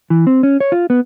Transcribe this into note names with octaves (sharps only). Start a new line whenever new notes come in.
E3
C4
C#4
C#5
F4
B3